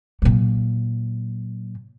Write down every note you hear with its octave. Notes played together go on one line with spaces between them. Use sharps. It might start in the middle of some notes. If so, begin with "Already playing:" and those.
A#2 F#3